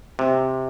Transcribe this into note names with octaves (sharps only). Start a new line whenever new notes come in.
C3